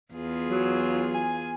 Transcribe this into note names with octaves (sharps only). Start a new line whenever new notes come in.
E2 F4 G#4
F#3
G#5